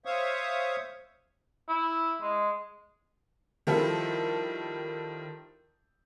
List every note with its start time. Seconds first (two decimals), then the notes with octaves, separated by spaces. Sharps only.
0.05 C5 C#5 E5 F5 C#6 D#6
1.69 E4
2.22 G#3
3.67 D#3 F3 G3 E4 A4